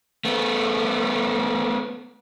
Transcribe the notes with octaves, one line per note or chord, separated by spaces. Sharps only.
A3 B3